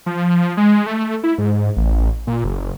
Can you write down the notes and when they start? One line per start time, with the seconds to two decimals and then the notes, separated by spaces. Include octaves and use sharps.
0.06 F3
0.57 G#3
0.86 A3
1.24 E4
1.38 G#2
1.77 A1
2.27 A#2
2.44 F#1